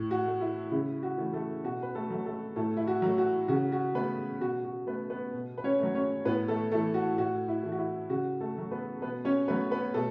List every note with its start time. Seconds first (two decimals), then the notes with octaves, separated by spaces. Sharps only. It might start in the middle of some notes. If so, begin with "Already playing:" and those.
Already playing: A2
0.11 F#4
0.26 A3
0.41 E4
0.71 C#3 E4
1.03 F#4
1.18 E3 A3
1.33 A3 A4
1.64 B2 F#4
1.83 B4
1.95 A3 A4
2.10 F#3 A3
2.25 A3 A4
2.56 A2 A3 A4
2.77 E4
2.87 F#4
3.02 F#3 A3
3.18 F#4
3.48 C#3 F#4
3.72 F#4
3.95 A3 B3 B4
4.41 B2 F#4
4.64 F#4
4.87 A3 B3 B4
5.10 B3 B4
5.33 B2
5.58 B4
5.64 C#4 C#5
5.79 F#3 A3
5.95 C#4 C#5
6.25 A2 B3 B4
6.48 A3 A4
6.71 A3 A4
6.75 E3
6.94 F#4
7.18 A2 F#4
7.48 E4
7.63 E3 A3
7.72 F#4
7.79 E4
8.10 C#3 F#4
8.40 A3 A4
8.56 F#3 A3
8.71 B3 B4
9.02 B2 B3 B4
9.25 C#4 C#5
9.48 F#3 A3 B3 B4
9.71 B3 B4
9.94 B2 A3 A4